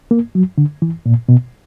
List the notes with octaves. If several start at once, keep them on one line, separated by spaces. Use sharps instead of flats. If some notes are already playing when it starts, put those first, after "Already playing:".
A#3
F#3
D3
E3
A#2
B2